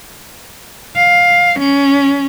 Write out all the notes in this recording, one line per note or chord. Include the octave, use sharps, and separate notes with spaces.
F5
C#4